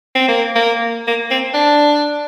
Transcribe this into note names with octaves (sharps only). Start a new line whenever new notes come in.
C4
A#3
A#3
A#3
C4
D4